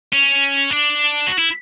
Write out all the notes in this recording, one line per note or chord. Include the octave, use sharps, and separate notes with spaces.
C#4
D4
F#4
E4